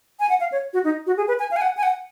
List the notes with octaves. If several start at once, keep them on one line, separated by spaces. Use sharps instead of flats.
G#5
F#5
F5
C#5
F#4
D#4
F#4
G#4
B4
G#5
F5
G#5
F#5
G#5
F#5